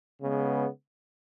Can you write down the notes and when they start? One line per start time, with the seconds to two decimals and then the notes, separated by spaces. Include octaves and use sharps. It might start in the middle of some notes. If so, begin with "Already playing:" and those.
0.20 C#3 G#3 B3